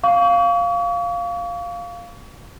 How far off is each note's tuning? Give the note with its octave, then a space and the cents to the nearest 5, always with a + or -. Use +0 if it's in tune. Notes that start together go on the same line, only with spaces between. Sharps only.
F5 +0 C#6 +40